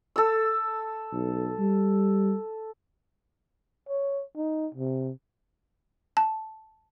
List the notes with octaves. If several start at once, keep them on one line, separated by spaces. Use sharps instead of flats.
A4 E6
B1
G3
C#5
D#4
C3
A5